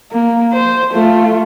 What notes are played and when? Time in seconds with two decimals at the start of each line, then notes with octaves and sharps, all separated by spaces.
0.12 A#3
0.53 C5
0.93 A3 F4